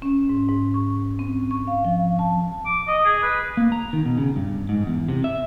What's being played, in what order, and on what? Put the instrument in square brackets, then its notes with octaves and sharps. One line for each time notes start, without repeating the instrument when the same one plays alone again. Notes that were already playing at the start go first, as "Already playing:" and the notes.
[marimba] C#4
G#2
G#2
C#6
C4
C#6
F5
F3
A5
[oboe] D6
D#5
G#4
B4
[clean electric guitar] A#3
A#5
D#3
B2
C#3
G2
G#2
E2
C3
E5